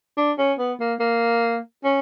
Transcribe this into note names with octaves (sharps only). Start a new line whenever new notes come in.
D4
C#4
B3
A#3
A#3
C#4